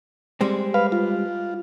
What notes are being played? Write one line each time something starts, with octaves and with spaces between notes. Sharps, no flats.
G3 G#3 C4
B4 F5
F4